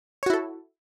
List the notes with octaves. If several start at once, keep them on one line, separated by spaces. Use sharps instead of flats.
E4 F#4 A4 C#5